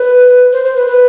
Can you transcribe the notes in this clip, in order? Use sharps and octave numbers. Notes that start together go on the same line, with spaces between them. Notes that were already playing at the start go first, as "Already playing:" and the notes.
Already playing: B4
C5
C5
B4
B4